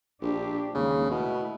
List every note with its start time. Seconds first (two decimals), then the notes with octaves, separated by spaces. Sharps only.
0.21 A#1 D4 G4
0.74 D#2 C#3 G#3
1.11 B2 A3 E4